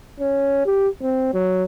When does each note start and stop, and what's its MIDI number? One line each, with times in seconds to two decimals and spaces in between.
0.20 0.61 61
0.66 0.88 67
1.02 1.31 60
1.34 1.63 54